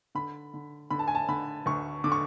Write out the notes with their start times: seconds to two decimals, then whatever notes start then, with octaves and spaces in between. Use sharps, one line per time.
0.15 D3 B5
0.54 D3
0.90 D3 B5
0.99 A5
1.08 G#5
1.15 A5
1.28 D3 B5
1.66 D2 C#6
2.04 D3 D6
2.12 C#6